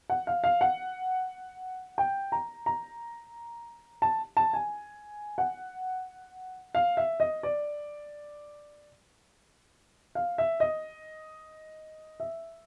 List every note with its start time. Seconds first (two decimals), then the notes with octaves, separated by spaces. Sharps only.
0.10 F#5
0.27 F5
0.44 F5
0.61 F#5
1.98 G5
2.32 A#5
2.66 A#5
4.02 A5
4.37 A5
4.53 G#5
5.38 F#5
6.75 F5
6.97 E5
7.20 D#5
7.43 D5
10.15 F5
10.38 E5
10.60 D#5
12.20 E5